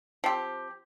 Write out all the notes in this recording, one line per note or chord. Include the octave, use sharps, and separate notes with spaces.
F3 C4 G4